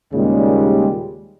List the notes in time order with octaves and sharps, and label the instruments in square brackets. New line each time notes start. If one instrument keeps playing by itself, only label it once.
[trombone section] D#2 A#2 C#3 G3 G#3